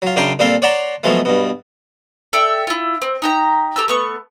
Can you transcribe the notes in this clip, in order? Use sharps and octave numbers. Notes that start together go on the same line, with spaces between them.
F#3 F4
F#2 C#3 D4 A#4 G5 C6
A#2 G3 C4 F4 A4 C6
C#5 D5 F#5 A5 A#5 C6
B2 F3 F#3 G#3 A3
G2 B2
A4 D5 E5 G5
E4 F4
C4
D#4 G4 A#5
G4 A4 A#5 E6
A3 B3 C#6